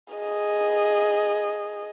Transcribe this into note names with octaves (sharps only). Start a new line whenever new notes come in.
G#4 D#5